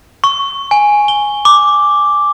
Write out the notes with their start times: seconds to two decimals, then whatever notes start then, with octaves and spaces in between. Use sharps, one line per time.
0.24 C#6
0.71 G#5
1.08 G7
1.45 D6